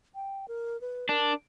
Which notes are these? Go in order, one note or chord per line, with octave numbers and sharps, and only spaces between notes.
G5
A#4
B4
D4 A#4